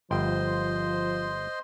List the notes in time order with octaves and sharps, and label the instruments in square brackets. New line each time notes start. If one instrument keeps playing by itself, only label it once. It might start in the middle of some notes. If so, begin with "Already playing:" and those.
[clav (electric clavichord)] G1 G5 [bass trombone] F3 [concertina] C5 D#5 C6